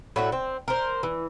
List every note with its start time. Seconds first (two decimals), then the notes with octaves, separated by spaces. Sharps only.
0.16 A2 F#4 E5
0.32 C4
0.68 A#4 C5
1.03 E3